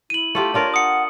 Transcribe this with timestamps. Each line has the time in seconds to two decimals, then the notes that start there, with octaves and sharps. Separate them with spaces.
0.10 E4 D#7 F#7
0.35 A3 F4 G4
0.54 D4 F4 A#4 C#5
0.74 F#5 D#6 C#7